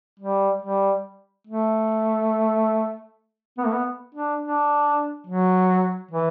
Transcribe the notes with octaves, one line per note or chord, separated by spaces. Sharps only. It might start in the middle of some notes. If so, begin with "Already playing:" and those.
G3
G3
A3
B3
A3
B3
D4
D4
F#3
E3